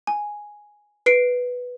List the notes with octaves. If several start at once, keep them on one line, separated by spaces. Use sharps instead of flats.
G#5
B4 C7 D7